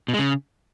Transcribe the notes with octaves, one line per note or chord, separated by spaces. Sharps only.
B2
G#3
C#3